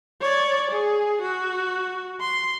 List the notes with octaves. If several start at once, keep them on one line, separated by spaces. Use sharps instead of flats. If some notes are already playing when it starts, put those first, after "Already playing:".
C#5 D5
G#4
F#4
C6